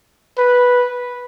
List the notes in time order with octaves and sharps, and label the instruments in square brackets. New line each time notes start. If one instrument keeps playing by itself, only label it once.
[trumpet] B4